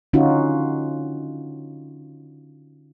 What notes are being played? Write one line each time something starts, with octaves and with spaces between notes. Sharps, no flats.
D3 C#4 D#4 F4 F#4